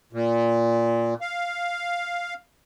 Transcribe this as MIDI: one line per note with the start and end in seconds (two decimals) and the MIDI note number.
0.13 1.14 46
1.21 2.34 77